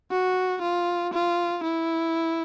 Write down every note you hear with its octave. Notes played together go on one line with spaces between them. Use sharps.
F#4
F4
F4
E4